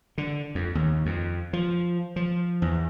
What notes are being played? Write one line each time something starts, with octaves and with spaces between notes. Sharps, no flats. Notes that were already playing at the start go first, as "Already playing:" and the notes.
D3
F2
D#2
F2
F3
F3
E2